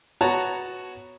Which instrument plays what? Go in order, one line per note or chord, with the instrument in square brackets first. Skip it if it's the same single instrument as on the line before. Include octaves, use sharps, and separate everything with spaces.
[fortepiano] B3 F#4 C#5 A5 A#5